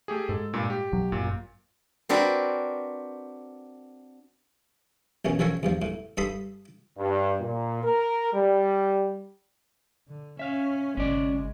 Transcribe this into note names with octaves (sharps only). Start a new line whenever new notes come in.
A3 G4 G#4
G#2 A4
G2 A#2
G4
B1 F#3
G#1 F#2 A#2
C4 D4 F#4 A#4 B4
A1 F#2 B2 C#4
A1 D#3 F3 A4 A#4 C#5
E2 G2 F3
A2
G2 A4 B5 C6 D#6
G2
A#2
A#4
G3
D3
C#4 E5 F5
G#1 C#3 G#3 C#4 D5